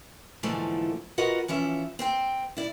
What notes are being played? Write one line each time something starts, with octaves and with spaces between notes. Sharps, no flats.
G#2 D3 E3 F3 A3 A#3
F4 F#4 A#4 B4 D#5 F#5
E3 F3 C#4 E5
C4 C5 G5
E4 D5